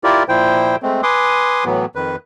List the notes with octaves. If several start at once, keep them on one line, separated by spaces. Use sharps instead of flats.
E4 F4 G4 A#4 D5
A#2 F3 E4 C5 G5
G#3 A3 C4
B4 G#5 C6 D6 D#6
A2 E3 F#3 B3
F2 D#3 B4